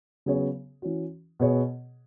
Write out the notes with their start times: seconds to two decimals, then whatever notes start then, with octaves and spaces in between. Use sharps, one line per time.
0.26 C#3 F#3 B3 G#4 C#5
0.82 E3 C#4 F#4
1.40 B2 B3 G#4 C#5